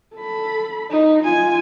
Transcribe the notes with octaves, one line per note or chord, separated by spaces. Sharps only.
A4 B5
D#4
F4 G#5